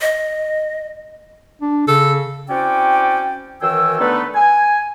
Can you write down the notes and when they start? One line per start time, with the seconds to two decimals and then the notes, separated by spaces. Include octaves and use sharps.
0.01 D#5
1.62 D4
1.88 C#3 A4
2.49 C4 C#4 E4 F#4 D5 G5
3.62 F#2 D#3 E3 G5 G#5 E6
3.99 D3 A3 B3 D#4 A4 B4
4.35 G#5